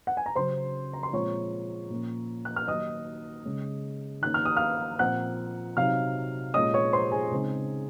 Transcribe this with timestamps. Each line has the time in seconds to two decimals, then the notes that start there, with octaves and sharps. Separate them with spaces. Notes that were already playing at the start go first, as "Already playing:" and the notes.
0.07 F#5
0.17 G#5
0.26 A#5
0.36 C#3 F#3 C#4 C5 C6
0.93 A#5
1.03 C6
1.13 A#2 F3 G#3 C4 C#5 C#6
1.90 A#2 F3 A#3 C#4
2.45 F#6
2.56 F6
2.67 D#3 F#3 A#3 D#4 D#5 D#6
3.45 C#3 G#3 C#4
4.22 D#3 A#3 C#4 F#6
4.34 F6
4.45 D#6
4.56 F5 F6
4.99 A#2 F3 C4 F#5 F#6
5.77 C3 F#3 C4 D#4 F5 F6
6.54 A#2 G#3 C#4 D#5 D#6
6.74 C#5 C#6
6.93 C5 C6
7.12 G#4 G#5
7.31 C#3 G#3 C4 D#4